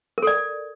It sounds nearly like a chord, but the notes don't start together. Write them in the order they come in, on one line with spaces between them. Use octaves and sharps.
A#4 A4 D5